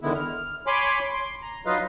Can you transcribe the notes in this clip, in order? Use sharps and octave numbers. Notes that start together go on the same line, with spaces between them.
E2 D3 D#3 G#3 B3 E4
F6
C#5 G#5 B5 C6 D6
C6
A#5
F#3 D#4 F4 B4 D#5 F5